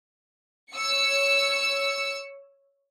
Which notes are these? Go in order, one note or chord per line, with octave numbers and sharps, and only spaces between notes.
C#5 E6 C#7